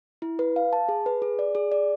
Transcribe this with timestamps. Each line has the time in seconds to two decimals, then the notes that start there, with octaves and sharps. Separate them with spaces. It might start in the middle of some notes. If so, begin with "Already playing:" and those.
0.22 E4
0.39 B4
0.56 F5
0.73 A5
0.89 G#4
1.06 B4
1.22 G#4
1.39 D5
1.55 G#4
1.72 D5